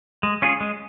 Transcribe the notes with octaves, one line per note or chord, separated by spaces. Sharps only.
G#3
C#4 F4 G#4
G#3